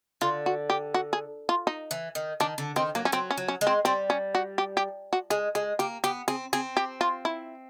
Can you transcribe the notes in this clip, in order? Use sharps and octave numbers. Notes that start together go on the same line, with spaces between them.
D3 F4
F#4
G4
F#4
G#4
F4
D#4
E3
D#3
D#3 D4
D3
D#3 C4
F#3 A#3
C#4
F#3 C4
C#4
F#3
C#4
G#3
C4
G3 C4
C#4
F#4
G4
G4
F#4
G#3 G#4
G#3 G#4
A#3 G4
B3 G4
C4 G#4
C4 G#4
G4
F4
E4